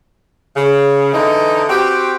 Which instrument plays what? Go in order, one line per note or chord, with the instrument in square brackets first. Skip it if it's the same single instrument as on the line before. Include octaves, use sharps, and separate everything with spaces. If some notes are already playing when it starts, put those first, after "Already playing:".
[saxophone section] C#3
D3 E3 D#4
C4 F#4 G4